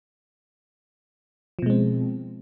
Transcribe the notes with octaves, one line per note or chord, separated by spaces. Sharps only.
B2 F3 G#3 C4